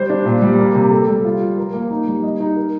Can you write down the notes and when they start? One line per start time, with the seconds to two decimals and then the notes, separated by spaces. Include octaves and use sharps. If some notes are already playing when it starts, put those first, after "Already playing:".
Already playing: G3 C5
0.10 D4
0.25 A#2
0.42 G3
0.58 A#3
0.75 C3
0.91 A4
1.08 G3
1.25 F4
1.41 F3
1.58 A#4
1.73 A#3
1.91 D#4
2.08 G3
2.23 D#5
2.40 D#4
2.56 A#4